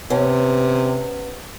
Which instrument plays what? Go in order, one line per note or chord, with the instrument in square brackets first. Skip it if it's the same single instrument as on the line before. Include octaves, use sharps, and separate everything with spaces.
[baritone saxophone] C3 [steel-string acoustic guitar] B3 C#4